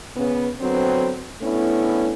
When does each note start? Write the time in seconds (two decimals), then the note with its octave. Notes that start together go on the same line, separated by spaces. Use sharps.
0.15 C#3 B3
0.60 D3 F#3 B3 C4
1.42 A3 B3 C#4 D4 E4